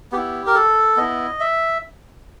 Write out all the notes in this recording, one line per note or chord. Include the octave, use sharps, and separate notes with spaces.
B3 E4 G4
A#4
A4
B3 E4 D#5
E5